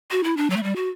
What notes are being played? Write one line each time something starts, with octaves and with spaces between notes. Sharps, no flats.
F#4
E4
D4
F#3
A3
G3
F#4